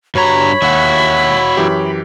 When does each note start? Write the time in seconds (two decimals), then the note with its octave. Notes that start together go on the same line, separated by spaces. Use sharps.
0.15 G2 F#4 C#5 A#5 B5 G#6
0.62 D#2 E4 F#4
1.57 F#2 E3 G4